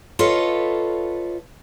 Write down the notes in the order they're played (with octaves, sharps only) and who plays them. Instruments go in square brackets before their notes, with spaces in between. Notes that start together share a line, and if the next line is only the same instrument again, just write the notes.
[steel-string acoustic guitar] F4 A4 B4 C#5 D#5 F5